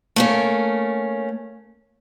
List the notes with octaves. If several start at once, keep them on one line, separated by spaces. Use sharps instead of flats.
A3 A#3 C#4